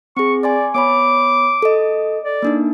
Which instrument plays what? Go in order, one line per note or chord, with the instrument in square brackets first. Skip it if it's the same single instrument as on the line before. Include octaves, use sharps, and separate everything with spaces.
[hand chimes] C4 G#4 [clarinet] C#6
[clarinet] D5 [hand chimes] G#5 C6 D6
[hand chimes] B3 C#5 B5 [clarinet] D6
[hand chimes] A4 D#5
[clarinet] D5
[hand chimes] A#3 D4 D#4